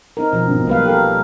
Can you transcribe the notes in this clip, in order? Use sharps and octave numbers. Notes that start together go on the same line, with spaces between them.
C4 D#4 A#4
B2 F3
G#1 C4 D4
B1 G3 A#3 B4 F5
G4 A4 A#4